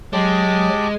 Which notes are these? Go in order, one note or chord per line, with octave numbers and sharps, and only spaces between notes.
F#3 G#3 G4 A5 D6